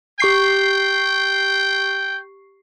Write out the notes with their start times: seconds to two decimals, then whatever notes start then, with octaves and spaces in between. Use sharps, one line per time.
0.20 G4 G5 C#6 C7